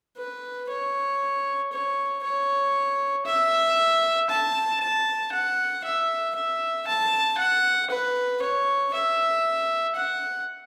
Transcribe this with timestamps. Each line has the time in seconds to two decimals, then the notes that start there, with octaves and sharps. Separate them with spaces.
0.17 B4
0.69 C#5
1.72 C#5
2.23 C#5
3.26 E5
4.30 A5
4.81 A5
5.32 F#5
5.84 E5
6.35 E5
6.87 A5
7.38 F#5
7.90 B4
8.42 C#5
8.94 E5
9.96 F#5